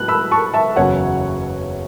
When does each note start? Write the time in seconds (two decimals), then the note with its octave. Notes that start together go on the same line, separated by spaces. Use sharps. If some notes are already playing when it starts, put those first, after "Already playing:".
Already playing: A2 F#3 B3 E4 F#6
0.08 B5 E6
0.31 A5 C#6
0.54 E5 A5
0.76 F#1 E2 C#3 F#3 C#5 F#5